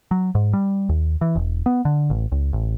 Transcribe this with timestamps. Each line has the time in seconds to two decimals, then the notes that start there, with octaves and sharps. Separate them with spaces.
0.11 F#3
0.35 G#2
0.53 G3
0.89 D#2
1.21 E3
1.36 E1
1.66 B3
1.85 D3
2.10 A1
2.32 C#2
2.53 A1